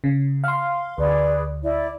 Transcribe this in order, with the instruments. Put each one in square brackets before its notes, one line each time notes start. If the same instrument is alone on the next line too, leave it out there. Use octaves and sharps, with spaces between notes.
[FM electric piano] C#3
F5 C6
[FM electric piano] D2 [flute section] G#4 B4 D5
[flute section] E4 D5